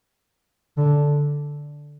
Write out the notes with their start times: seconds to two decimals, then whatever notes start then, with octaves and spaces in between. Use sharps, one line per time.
0.77 D3